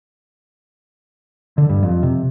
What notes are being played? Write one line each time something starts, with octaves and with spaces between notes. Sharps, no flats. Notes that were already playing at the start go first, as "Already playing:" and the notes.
D3
G2
F2
C3